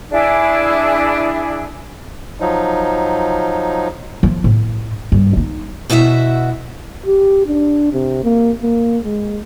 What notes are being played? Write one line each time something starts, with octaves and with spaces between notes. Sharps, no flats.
D4 E4 G#4
F3 F#3 D#4
F3
A2
G2
D#4
B2 E4 F#4 D5 E5
G4
D4
C3
A#3
A#3
G#3